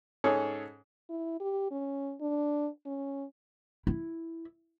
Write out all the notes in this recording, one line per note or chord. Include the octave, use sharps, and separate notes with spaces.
G#2 C#4 G#4 A4 C#5
E4
G4
C#4
D4
C#4
E4